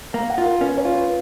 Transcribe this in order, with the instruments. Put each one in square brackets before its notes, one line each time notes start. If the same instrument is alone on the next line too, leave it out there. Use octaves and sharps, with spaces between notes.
[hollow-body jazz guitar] A#3 [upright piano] A#5
[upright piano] F#5
[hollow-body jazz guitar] F4
[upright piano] A#4
[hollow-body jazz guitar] C#4 [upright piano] B4
[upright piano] C#5
[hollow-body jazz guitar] F4
[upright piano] B4